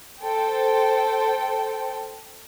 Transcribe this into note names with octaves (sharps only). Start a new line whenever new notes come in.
A4 C5 G5